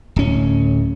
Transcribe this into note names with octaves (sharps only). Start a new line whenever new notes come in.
D1 C#4